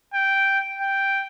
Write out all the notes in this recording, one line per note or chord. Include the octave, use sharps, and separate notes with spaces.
G5
G5